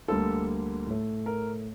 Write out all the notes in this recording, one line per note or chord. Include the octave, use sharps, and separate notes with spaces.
D2 D3 G3 A#3 A4
A2 A3
A#4